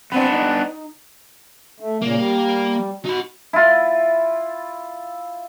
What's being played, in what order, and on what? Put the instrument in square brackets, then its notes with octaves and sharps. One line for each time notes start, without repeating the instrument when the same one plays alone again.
[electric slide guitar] B3 D4 [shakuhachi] C4
[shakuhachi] D#4
[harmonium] A3
[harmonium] A#2 C#3 [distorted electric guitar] A#3
[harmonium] G3
[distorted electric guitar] D#4 B5 [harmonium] F#4
[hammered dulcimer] E4 F4